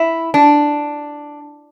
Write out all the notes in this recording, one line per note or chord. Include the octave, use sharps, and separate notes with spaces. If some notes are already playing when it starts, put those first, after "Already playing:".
Already playing: E4
D4